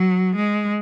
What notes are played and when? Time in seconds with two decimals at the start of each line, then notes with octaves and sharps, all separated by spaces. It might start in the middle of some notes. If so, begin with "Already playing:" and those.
Already playing: F#3
0.36 G#3